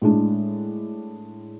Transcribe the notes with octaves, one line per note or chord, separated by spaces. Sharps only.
A2 G#3 D4